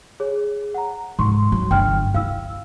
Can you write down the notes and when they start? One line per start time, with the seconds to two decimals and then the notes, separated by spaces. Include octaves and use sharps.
0.20 G#4 C#5
0.74 F#5 A#5
1.19 G#2 C6 C#6
1.52 F#3
1.71 G1 G5 F6
2.14 E4 F5 E6